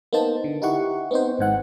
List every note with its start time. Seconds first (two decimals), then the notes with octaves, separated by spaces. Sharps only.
0.13 A#3 B3 D#4 C5 A5
0.44 D3
0.62 D#4 E4 G4 F#5 C#6
1.11 B3 C4 D#4 C5
1.39 G#1 G#2 F#5 F#6